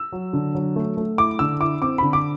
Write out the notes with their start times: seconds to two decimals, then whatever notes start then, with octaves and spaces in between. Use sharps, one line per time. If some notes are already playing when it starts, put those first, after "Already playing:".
Already playing: E6
0.12 F#3
0.33 D3
0.55 F#3
0.76 A3
0.97 A3
1.18 E4 D6
1.39 D3 E6
1.61 E4 D6
1.82 C4 D6
1.98 D3 B5
2.13 D6